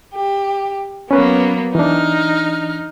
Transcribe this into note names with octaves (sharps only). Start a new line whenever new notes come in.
G4
F#3 A#3 B3 C#4 B4
E3 D4 D#4 F6